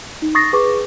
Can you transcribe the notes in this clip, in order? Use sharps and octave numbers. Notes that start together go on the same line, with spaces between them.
D#4
C#6 D#6 A6 A#6 C7
G#4 B4 C#6 D6